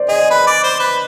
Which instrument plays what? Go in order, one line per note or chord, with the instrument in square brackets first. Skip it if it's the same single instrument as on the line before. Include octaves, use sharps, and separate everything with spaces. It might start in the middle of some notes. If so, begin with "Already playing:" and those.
Already playing: [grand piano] C5 D5
[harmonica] G#4 [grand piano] D#5
[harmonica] B4
D5
C5
B4